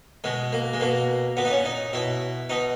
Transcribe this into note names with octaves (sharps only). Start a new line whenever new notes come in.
B2 G#3
A#3
G#3
B2 A#3
A#2 B3
D#4
C#4
D#4
B2 E4
B2 D#4